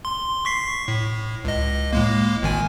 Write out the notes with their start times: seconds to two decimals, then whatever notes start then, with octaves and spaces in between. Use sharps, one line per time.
0.05 C6
0.45 C#6 B6 C7
0.88 A2
1.45 C#2 D#5
1.93 A2 G#3 A#3
2.43 G#1 D#3 G#5